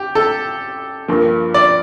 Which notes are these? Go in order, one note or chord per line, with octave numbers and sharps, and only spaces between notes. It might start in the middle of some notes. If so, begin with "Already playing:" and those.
Already playing: G4
A4
G2 F3 A#3
D5